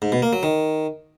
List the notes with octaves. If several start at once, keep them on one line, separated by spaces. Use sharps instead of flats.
G#2
B2
A#3
F#3
D#3